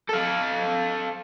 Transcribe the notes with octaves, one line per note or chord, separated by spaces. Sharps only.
A4 F5